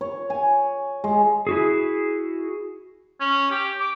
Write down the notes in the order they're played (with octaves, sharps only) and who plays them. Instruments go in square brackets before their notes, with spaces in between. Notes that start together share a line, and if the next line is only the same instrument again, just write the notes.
[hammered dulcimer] C#5
G#5
G#3
[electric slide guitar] E4 F#4 G#4
[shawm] C#4
G4
D6